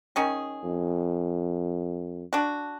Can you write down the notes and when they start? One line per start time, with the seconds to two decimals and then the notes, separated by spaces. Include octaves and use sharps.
0.16 D#3 C#4 G#4
0.63 F2
2.33 D4 F#4